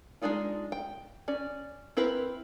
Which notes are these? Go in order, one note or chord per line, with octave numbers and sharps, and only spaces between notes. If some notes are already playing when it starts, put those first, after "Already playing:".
G#3 B3 D4 D#4 F4
G5
C#4 D5
C4 E4 A#4 B4